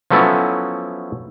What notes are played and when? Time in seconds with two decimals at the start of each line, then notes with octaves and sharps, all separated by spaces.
0.10 F3 F#3 A3 B3 C#4 E4